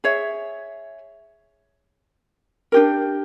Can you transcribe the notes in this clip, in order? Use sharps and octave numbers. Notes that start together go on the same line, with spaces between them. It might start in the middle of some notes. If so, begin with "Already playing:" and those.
G#4 C#5 E5
D4 G4 A#4